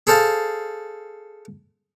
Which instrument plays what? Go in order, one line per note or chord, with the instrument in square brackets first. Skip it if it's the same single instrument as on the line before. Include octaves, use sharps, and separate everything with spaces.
[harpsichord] G#4 A4 C5 F5 A5